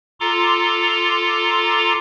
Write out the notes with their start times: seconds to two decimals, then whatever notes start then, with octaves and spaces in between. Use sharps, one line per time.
0.20 F4 A4 A#5 C6 D6